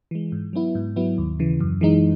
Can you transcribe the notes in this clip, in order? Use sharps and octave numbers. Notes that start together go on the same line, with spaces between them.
E3 G#3
G#2
F#3 B3 E4
G#2
F#3 B3 E4
D#2
C#3 E3
F#2
E3 G#3 D#4